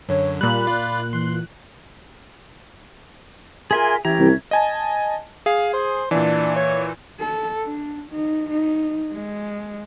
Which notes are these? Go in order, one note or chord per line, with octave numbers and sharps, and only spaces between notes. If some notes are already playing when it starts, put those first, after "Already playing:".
F#2 D3 C#5
A#2 G3 B5 F#6
F4 D5
E3 C6
F4 G#4 A#4 E5 G#5 C6
E3 C#4 G4 E5 A#5 G#6
C2
D#5 G#5 A5
G#4 F5
C5
A#2 E3 D4
C#5
A4
D4
D#4
D#4
G#3